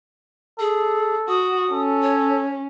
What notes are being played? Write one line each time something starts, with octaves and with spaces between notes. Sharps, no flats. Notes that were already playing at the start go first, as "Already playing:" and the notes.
G#4 A4
F#4 D#6
C#4 A4
C#5